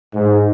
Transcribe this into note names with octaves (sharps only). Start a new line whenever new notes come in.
G#2